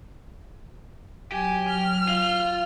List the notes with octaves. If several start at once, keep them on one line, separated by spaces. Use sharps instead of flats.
F#3 G4 G#5
F6
F4